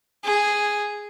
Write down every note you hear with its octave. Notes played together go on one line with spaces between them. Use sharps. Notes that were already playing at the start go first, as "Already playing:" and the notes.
G#4